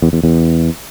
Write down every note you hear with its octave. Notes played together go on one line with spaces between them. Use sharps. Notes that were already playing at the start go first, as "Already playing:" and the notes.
E2
E2
E2